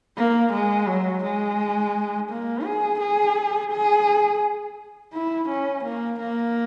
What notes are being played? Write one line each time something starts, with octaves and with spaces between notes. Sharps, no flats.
A#3
G#3
F#3
G#3
A#3
G#4
G#4
G#4
E4
C#4
A#3
A#3